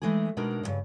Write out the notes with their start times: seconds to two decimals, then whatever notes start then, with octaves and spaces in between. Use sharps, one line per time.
0.02 E3 G#3 A3 D#4 G#4
0.37 B2 G#3 D4 D#4 A#4
0.63 D2 G2 C#3